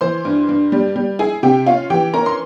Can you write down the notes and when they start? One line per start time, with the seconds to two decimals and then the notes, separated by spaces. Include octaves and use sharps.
0.01 E3 C5 C6
0.25 G2
0.49 G2
0.72 G3
0.96 G3
1.19 E4 G#4 G#5
1.43 C3 G4 G5
1.66 C#4 F4 F5
1.90 E3 G4 G5
2.14 C#4 A#4 A#5
2.26 C6